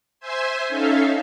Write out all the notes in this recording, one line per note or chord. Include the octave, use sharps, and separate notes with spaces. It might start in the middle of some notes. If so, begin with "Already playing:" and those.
C5 E5 G#5 C6
C#4 D#4 A4 E5 F5